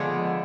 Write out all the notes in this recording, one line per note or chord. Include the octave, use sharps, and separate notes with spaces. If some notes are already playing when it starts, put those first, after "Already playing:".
Already playing: D3 F3 G#3 B3 D4